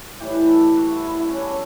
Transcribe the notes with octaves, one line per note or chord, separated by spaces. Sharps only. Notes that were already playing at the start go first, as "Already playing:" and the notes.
Already playing: F#4
A2 E3 G3 G4
B4
A4
A4
F#4
E4
E4 F#4
E4
C#4
B2 G3 D4
C#4